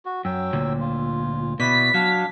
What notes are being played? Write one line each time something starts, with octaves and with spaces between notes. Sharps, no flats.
F#4
F#2 F#3 G5 E6
D2 A#2
F4
B2 E4 B4 D5 B6
F#3 D4 F5